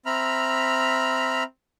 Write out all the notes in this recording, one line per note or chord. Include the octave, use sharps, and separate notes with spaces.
C4 E5 A#5 B5 F6